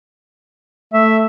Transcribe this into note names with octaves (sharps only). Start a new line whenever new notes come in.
A3 E5